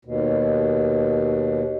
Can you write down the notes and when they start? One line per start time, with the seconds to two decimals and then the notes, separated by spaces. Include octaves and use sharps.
0.05 D#2 B2